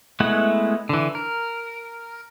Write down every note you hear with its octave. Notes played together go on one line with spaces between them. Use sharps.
G#3 A3 B3 E4 F#5
D3 E3
A#4